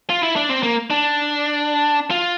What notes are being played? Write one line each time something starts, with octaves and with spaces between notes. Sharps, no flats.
F4
E4
D4
C4
A#3
D4
F4